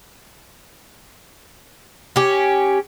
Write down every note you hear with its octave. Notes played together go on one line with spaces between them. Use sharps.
C#4 G4